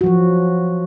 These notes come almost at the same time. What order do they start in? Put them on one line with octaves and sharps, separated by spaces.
F#4 F3 F#3